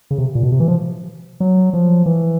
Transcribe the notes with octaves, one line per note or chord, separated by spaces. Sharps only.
C#3
C3
A#2
B2
C3
E3
F3
F#3
F3
E3